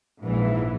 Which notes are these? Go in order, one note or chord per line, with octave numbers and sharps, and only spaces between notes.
A#1 G#2 E3